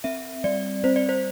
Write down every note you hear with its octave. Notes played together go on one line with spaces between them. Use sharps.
C4 E5
G3 D5
C4 C5
D5
C5